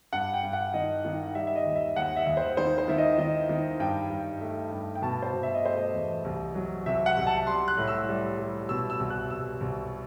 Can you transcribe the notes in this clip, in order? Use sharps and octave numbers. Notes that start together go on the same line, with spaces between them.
G2 F#5
G5
G2
F#5
D#3 D#5
D#3
G3 E5
E5
D#5
D#2
E5
D#2 F#5
E5
D#2
C5
D#3 C5
C5
D#3 E5
D#5
D#3 D#5
D#3
G2 G5
G2
A3
G2
G5
B2 A5
C5
B2
E5
D#5
A3 C5
D#5
E2
C2
F#3
C3 E5
F#5
C2
A5
G3 C6
F#6
A2
E6
G3
G3
B2 E6
E6
C2
F#6
C2 E6
C2